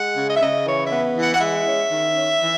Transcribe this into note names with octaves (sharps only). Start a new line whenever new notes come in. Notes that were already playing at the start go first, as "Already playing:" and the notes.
Already playing: G#3 F#5
C#3
D#5
E5
C#3 D#5
E3 C#5
E5
B3
E3
F#5
F#5
G#3 E5
C#4
D#3
C#4
E3